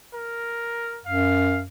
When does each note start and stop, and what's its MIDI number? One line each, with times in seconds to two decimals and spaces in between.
0.14 1.01 70
1.06 1.67 42
1.06 1.60 77